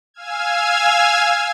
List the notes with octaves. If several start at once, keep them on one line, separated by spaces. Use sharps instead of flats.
F5 G#5 E6 F6 G#6